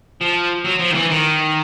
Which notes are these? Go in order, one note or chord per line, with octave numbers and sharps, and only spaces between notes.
F3
F#3
F3
D#3
E3
D#3